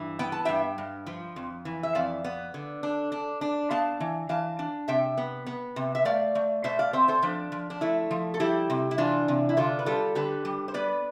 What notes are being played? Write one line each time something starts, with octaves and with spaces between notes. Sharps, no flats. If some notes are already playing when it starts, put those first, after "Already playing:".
Already playing: G2 E3
B3 G5
A5
G2 E5 G5
G2
F3
F2
E3
E5
F2 D5 F5
B3
D3
D4
D4
D4
B3 F5 A5
E3
E3 F5 A5
D4
C3 E5 G5
B3
B3
C3
E5
A3 D5 F5
A3
B2 C5 E5
D5 F5
C4 C5 E5
A4 C5
F3 D4
F3
D4
A3 E4
F3
A4
G3 E4 G4
C3
E4
E3 D4 F4
C3
E4
D3 D4 F4
B4
G3 F4 A4
D3 G4 B4
G3
C5
B3 B4 D5